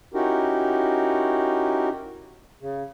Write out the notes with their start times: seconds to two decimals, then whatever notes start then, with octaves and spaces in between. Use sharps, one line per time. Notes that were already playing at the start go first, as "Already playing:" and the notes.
0.14 C#4 D#4 E4 F#4 G4 A#4
2.61 C#3